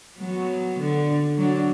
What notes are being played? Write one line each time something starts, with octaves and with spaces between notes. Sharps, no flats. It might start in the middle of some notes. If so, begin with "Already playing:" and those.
F#3 B3
D3
F#3 D4